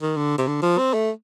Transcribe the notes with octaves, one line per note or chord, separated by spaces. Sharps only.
D#3
D3
C3
D3
F3
C4
A3